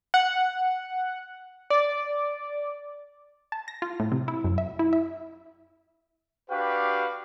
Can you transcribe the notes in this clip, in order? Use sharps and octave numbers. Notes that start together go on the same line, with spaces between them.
F#5
D5
A5
A#6
F4
A2
C3
E4
F#2
E5
E4
E5
D4 F#4 G4 B4 F5 G5